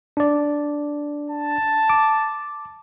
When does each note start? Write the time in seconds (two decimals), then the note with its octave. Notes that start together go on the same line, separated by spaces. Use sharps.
0.17 D4 D5
1.30 A5
1.90 D6